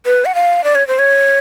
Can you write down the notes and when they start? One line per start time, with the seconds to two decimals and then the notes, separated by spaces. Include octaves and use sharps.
0.06 B4
0.25 F#5
0.35 F5
0.64 D5
0.75 C#5
0.88 C5
0.99 C#5